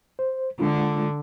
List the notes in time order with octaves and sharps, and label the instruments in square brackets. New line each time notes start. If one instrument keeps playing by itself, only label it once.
[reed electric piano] C5
[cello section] D3 [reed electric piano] G#3 D4 F4